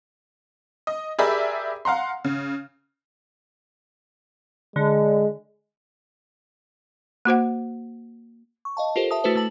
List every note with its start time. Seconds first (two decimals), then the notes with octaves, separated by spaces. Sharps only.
0.87 D#5
1.19 G4 G#4 A#4 D5 E5 B5
1.85 F5 F#5 A#5 C6
2.24 C#3
4.76 D3 G#3
7.25 A#3 F#4 C5 F#5
8.65 C#6
8.77 D#5 F5 A5
8.96 F4 G4 A4 A#4 C5
9.11 E5 A5 D#6
9.24 A3 E4 F#4 A4 B4 C5
9.36 A3 A5 F#7